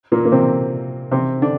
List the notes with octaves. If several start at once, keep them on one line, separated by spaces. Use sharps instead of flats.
A#2 A#3
A#3
C3 C4
C3 C4
D3 D4